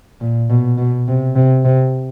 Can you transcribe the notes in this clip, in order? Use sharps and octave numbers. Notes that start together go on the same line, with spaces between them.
A#2
B2
B2
C3
C3
C3